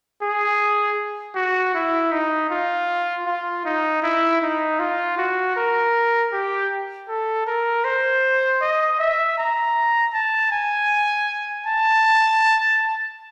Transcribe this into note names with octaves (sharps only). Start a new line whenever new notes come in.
G#4
F#4
E4
D#4
F4
F4
D#4
E4
D#4
F4
F#4
A#4
G4
A4
A#4
C5
D#5
E5
A#5
A5
G#5
A5